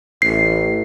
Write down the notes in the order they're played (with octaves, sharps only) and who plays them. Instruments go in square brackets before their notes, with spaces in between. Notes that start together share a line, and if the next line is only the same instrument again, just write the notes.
[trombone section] A1 [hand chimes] C7